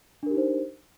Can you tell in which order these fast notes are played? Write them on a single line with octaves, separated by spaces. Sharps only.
D4 A#4 G4 D#4 C5